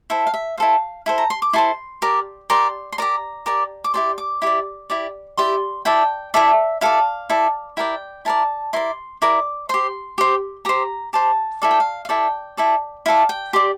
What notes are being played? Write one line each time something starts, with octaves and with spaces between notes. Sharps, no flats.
E4 A4 C5 E5
F5
E5
E4 A4 C5 F5
E4 A4 C5
A#5
C6
D6
E4 A4 C5 C6
G4 A#4 D5
G4 A#4 D5 C6
C6
G4 A#4 D5 A#5
G4 A#4 D5
D6
E4 G4 D5 C6
D6
E4 G4 D5
E4 G4 D5
E4 G4 D5 C6
E4 A4 D5 G5
E4 A4 D5 E5
E4 A4 D5 F5
E4 A4 D5
E4 A#4 D5 G5
E4 A#4 D5 A5
E4 A#4 D5 C6
E4 A#4 D5 D6
G4 C5 C6
G4 C5
G4 C5 A#5
G4 C5 A5
E4 A4 D5 F5
G5
F5
F5
E4 A4 D5 G5
E4 A4 D5
E4 A4 D5 F5
G5
G4 D5 C6